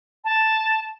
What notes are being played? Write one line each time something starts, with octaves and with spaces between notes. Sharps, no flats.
A5